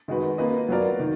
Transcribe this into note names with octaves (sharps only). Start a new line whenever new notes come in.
D#3 G#3 D#4 F#4 B4
A#3 F4 B4 D#5
F#3 B3 F4 A#4 D5
D#3